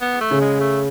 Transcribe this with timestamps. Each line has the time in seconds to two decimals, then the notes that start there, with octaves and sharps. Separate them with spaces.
0.01 B3
0.21 A3
0.31 C#3
0.41 G#3
0.60 A3